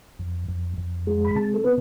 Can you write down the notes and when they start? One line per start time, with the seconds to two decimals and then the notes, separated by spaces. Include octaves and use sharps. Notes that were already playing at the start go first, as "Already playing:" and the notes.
0.19 F2
0.48 F2
0.78 F2
1.07 G#3
1.25 B5
1.36 C3 A5
1.54 A4
1.64 B3 B4